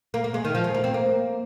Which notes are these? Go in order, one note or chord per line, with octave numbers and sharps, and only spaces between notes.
A#3
A#3
G#3
D#3
F3
G#3
A#3
C4
A#3